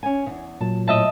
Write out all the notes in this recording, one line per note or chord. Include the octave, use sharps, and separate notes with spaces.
C#4 G#5
E2 C#3
A#2 F#3 A5
A2 D#5 E5 A5